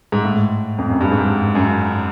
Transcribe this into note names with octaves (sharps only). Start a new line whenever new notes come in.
G#2
A2
F2
F#2
G2
G#2
F#2